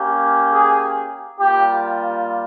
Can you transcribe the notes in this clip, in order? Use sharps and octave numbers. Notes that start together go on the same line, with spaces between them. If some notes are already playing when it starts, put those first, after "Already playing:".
Already playing: A#3 C#4 G4
G#4
G3 A#3 F4 G4